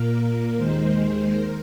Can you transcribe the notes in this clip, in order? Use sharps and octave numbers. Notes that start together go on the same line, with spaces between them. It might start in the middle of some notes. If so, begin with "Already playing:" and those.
Already playing: A#2 A#3 A#4
D#2 D#3 G#3 C5
A#4